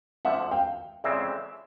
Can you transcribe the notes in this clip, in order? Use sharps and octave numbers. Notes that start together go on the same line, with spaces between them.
D2 D3 F3 E5 F#5
F5 G5
F2 C#3 E3 G#3 C4 D5 E5